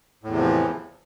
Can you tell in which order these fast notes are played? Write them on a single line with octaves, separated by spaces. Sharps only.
A2 E2 C3 F3 E3